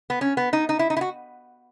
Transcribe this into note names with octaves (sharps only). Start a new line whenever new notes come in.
B3
C#4
B3
D#4
D#4
E4
D#4
E4
F#4